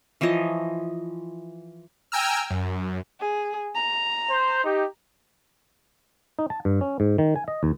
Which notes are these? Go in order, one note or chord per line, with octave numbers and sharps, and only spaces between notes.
E3 F3 C#5 D#5
G5 G#5 A#5 E6 F6
F#2
G#4
A#5
C5
D#4 G4
D#4
A5
G2
C#4
G#2
D#3
G#5
D#5
D#2